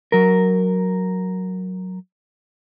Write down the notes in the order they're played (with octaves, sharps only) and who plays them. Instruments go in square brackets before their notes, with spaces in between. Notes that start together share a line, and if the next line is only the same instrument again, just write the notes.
[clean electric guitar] F#3 A#4